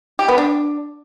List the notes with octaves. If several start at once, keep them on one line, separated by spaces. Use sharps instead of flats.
G4
B3
D4